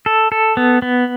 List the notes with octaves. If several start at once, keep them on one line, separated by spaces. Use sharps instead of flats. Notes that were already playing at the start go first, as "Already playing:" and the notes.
A4
A4
B3
B3